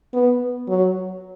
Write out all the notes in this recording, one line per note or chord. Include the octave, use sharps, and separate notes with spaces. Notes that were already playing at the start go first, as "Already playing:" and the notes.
B3
F#3